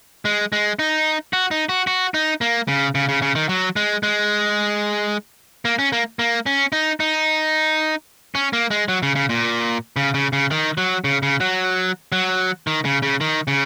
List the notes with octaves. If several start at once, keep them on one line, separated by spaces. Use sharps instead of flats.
G#3
G#3
D#4
F#4
D#4
F#4
F#4
D#4
A#3
C#3
C#3
C#3
C#3
D#3
F#3
G#3
G#3
A#3
C#4
A#3
A#3
C#4
D#4
D#4
C#4
A#3
G#3
F#3
C#3
C#3
A#2
C#3
C#3
C#3
D#3
F#3
C#3
C#3
F#3
F#3
D#3
C#3
C#3
D#3
C#3